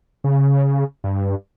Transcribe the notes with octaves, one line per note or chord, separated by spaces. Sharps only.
C#3
G2